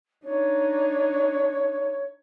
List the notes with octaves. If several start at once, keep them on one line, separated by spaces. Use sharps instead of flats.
D4 D#4 C#5